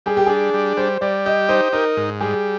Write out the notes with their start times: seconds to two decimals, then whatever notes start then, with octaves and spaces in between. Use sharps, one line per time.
0.06 G3 G#4
0.17 G4
0.26 D4 G#4
0.54 G3
0.77 G3 C5
1.01 G3 D5
1.26 G4 D#5
1.49 D#4 C5
1.73 D#4 A#4
1.97 G#2
2.20 G3 G#4